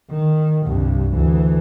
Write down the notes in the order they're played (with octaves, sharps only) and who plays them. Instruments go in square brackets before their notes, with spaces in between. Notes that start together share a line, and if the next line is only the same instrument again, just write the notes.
[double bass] D#3
C2 G2
D2 E3